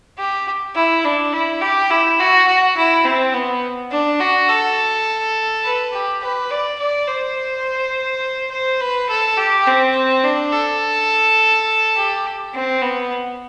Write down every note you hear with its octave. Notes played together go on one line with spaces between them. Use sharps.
G4
E4
D4
E4
G4
E4
F#4
F#4
E4
C4
B3
D4
F#4
A4
B4
G4
B4
D5
D5
C5
C5
B4
A4
G4
C4
D4
A4
G4
C4
B3